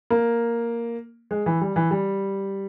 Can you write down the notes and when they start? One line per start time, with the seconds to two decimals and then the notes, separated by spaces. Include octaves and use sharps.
0.10 A#3
1.31 G#3
1.46 E3
1.61 G3
1.76 E3
1.91 G3